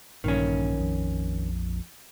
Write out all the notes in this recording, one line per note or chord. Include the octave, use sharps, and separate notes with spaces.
A#1 G2 A#2 D#3 E3 C#4
F2